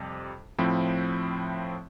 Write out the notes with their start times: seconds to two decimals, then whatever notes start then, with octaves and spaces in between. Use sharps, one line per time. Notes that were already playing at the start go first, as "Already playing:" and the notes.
Already playing: F2 C3 G3
0.58 A2 F3 C4 E4